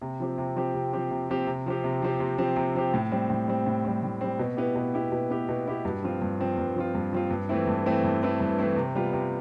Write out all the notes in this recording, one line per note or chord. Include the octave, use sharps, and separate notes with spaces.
C3
F3 C4 G4
C3
F3 C4 G4
C3
F3 C4 G4
C3
F3 C4 G4
C3
F3 C4 G4
C3
F3 C4 G4
C3
F3 C4 G4
C3
F3 C4 G4
A2
G3 C4
A2
G3 C4
A2
G3 C4
A2
G3 C4
B2
B3 E4 G4
B2
B3 E4 G4
B2
B3 E4 G4
B2
B3 E4 G4
G2
F3 C4 F4
G2
F3 C4 F4
G2
F3 C4 F4
G2
F3 C4 F4
G2
E3 A3 C4 E4
G2
E3 A3 C4 E4
G2
E3 A3 C4 E4
G2
E3 A3 C4 E4
C3
G3 B3 F4
C3